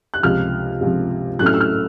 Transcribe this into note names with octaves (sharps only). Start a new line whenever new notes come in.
F#6
C#2 C3 F3 F6
C#2 C3 F3
A2 F#3 A3 C#4 F#6
F6
E6
F6